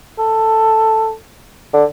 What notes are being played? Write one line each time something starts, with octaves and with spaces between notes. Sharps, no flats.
A4
D3